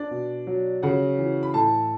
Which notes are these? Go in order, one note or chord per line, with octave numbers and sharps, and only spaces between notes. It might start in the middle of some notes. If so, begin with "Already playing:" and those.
Already playing: D4 D5
B2
F#3
C#3 F#4 F#5
E3
B5
A2 A4 A5